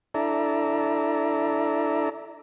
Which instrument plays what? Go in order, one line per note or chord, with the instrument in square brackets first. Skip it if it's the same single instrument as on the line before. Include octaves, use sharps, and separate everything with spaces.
[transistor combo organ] D4 E4 A4 D5 E5 A#5